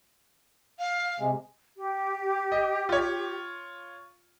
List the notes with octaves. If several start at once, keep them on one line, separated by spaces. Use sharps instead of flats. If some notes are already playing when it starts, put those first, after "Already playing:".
F5
C3 G#3
G4
D#5
F4 C#5